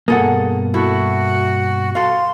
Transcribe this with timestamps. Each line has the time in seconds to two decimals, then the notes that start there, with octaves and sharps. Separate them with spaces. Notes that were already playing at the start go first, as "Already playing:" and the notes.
0.08 G2 B2 A#3 G#4 A4 F#5
0.74 E4 F#4 A4
1.95 A4 F5 C6